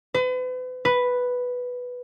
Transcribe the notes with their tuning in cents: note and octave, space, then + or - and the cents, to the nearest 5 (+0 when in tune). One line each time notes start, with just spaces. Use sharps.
B4 +40
B4 +0